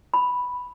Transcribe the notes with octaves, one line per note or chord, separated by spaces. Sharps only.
B5